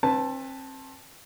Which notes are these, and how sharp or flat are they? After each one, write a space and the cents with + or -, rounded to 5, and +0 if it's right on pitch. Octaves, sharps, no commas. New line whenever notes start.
C4 +35 B4 +0 A5 +0